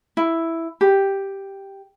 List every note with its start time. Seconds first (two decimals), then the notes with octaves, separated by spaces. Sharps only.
0.17 E4
0.81 G4